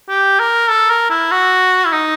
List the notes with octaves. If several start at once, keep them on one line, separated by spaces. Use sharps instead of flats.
G4
A#4
A4
A#4
E4
F#4
E4
D#4